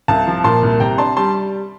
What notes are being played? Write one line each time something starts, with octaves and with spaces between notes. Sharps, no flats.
C2 F5 A5
F3
A#2 A5 C6
C2
C3 G5 A#5
D4 A5 C6
G3 A5 C6